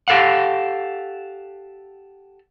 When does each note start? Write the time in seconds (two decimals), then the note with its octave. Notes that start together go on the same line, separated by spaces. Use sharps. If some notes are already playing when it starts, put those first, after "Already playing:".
0.08 G4 A4 F5 F#5